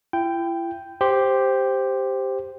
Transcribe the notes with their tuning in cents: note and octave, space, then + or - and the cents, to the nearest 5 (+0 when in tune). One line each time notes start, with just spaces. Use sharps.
E4 +40 G5 +0
G4 +0 C5 +0